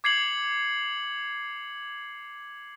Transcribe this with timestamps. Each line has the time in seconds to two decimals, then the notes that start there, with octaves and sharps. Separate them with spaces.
0.04 D6 G#6 C7 C#7 F#7